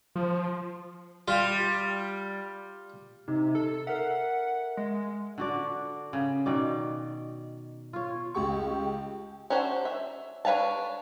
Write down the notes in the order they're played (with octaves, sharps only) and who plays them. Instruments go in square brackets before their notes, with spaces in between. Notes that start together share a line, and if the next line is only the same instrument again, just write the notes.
[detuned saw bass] F3
[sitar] G3 [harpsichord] F4
[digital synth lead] C3 [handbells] D#4
[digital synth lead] A4
[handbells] A#4 E5 [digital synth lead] F#5
[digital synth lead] G#3
[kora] D3 F#4 D5
C#3
B2 D#3 D5
F4 C#5
[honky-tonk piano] C#2 G4 C#6
[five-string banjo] C#4 D4 F#4 C5
E5
D4 B4 C#5 F5 A5